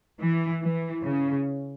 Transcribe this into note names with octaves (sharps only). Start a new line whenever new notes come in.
E3
E3
C#3